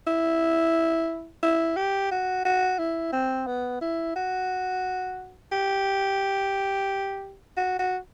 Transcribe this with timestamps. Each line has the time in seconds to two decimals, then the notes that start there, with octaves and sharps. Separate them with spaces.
0.07 E4
1.43 E4
1.76 G4
2.11 F#4
2.45 F#4
2.79 E4
3.13 C4
3.47 B3
3.81 E4
4.16 F#4
5.52 G4
7.57 F#4
7.79 F#4